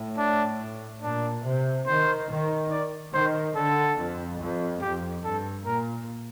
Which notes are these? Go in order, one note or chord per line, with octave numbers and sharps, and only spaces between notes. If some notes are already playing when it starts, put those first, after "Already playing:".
Already playing: A2
D4
A#2 D4
C3
D#3 C5
D#3
D5
D#3 C5
D3 A4
F2
F2
F2 G4
G2 A4
A#2 A#4